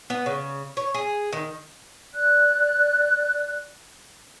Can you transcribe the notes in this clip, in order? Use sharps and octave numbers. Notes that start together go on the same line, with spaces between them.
B3
C#3
C#5
G#4
D#3
D5 F#6